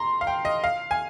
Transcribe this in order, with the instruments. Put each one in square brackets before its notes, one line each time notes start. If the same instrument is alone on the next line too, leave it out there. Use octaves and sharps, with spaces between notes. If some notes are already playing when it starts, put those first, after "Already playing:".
Already playing: [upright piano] A#5 C6
F5
G5
D#5
F5
G#5